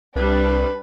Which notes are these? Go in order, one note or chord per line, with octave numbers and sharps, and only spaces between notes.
C2 G3 D4 B4